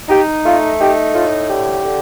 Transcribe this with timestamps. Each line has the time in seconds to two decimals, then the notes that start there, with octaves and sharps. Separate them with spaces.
0.09 D#4 G4
0.45 A3 F4
0.79 D#4 G4
1.14 A2 F4
1.48 D3 G4
1.84 D3